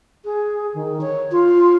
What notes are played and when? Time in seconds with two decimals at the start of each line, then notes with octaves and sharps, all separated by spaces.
0.25 G#4
0.74 D#3
1.01 C#5
1.32 F4